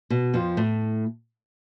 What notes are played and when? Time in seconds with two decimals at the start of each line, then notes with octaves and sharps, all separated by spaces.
0.10 B2
0.34 F2 F3
0.57 A2 A3